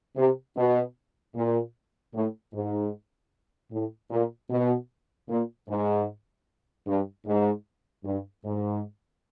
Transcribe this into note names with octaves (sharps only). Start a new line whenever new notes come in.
C3
B2
A#2
A2
G#2
A2
A#2
B2
A#2
G#2
G2
G#2
G2
G#2